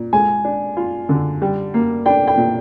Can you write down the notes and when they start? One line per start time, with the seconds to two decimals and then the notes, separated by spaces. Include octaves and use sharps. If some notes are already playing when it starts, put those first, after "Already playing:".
Already playing: A#2
0.13 G#3 G#5
0.45 D4
0.77 F4
1.09 D3
1.42 G3
1.74 A#3
2.06 D4 G5
2.27 G5
2.37 A#2